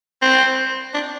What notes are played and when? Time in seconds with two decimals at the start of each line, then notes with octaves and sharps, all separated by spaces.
0.22 C4
0.94 D4